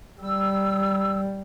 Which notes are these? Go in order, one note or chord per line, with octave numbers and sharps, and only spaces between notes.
G3 E6